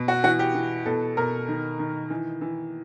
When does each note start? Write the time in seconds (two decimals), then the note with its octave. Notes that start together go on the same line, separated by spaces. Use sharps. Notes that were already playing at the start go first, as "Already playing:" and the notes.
Already playing: B2
0.08 F#4
0.23 E3 F#4
0.39 G4
0.54 E3
0.86 B2 A4
1.17 B2 A#4
1.48 D#3
1.79 D#3
2.10 E3
2.41 E3